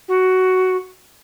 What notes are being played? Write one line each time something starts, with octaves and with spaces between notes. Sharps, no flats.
F#4